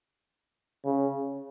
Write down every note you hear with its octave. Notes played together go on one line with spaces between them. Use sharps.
C#3